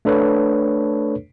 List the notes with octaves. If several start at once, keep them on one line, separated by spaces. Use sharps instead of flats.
A3 D4 A4 B4 C#5